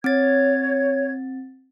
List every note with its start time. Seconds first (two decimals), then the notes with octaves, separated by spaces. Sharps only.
0.04 C4 C#5 G#6 A6